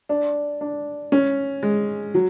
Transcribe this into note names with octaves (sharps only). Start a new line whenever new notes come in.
D4
D4
C#4
G#3
F#3